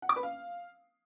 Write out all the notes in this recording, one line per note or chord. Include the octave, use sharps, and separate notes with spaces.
F#5
D6
B4
F5